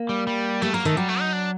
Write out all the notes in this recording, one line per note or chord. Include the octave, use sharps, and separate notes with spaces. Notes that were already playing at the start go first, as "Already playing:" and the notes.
Already playing: A#3
G3
G3
G3 A3
F#3 A#3
D#3 A3
F#3 G3
A3
D#4
D4